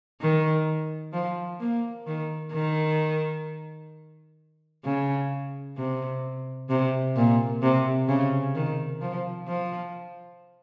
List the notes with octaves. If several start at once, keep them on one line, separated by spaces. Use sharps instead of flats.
D#3
F3
A#3
D#3
D#3
C#3
C3
C3
A#2
C3
C#3
D#3
F3
F3